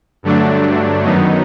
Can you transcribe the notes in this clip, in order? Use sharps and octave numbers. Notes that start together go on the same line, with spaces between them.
G2 D3 F#3 A3 D4
F#2 D#3 F#3 B3 D#4